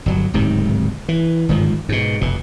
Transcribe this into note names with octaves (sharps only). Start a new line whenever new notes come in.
G1 F#3
D1 G#2 C3 D#3
E3
G1 G#2 D#3 F3
G#2 B2
F1 B2